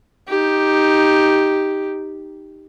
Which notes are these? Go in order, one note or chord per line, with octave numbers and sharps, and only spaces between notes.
D#4 G4